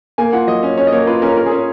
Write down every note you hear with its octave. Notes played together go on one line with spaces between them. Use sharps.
A#3 G#5
F4 F#5
F#3 D#5
C#4
C#4 C#5
D#5
A#3 C#5
F4 B4
C#4 A#4
F4 A#4
G#4
C#4